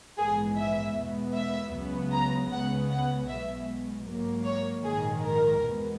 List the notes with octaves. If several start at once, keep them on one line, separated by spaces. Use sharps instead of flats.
A#1 G#2 E3 G#3 B3 G#4
E5
E2 B2 G#3 B3
E5
C#2 C#3 F#3 B3
A#5
C#2 C#3 G#3 B3 F#5
F#5
B1 B2 G#3 E5
G#2 F#3 A#3
C#5
A#1 G#2 D#3 G#4
A#4
E2 B2 G#3 B3